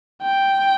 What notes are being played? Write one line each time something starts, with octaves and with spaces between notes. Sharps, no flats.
G5